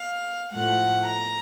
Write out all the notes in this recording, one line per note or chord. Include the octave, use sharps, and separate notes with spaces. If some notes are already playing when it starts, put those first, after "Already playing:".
Already playing: F5
A2 F3 A3 F#5
A#5